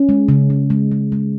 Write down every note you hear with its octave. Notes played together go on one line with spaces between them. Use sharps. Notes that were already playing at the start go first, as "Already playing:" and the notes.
Already playing: C#4
G#3
C#3
C#3
G#3
G#3
G#3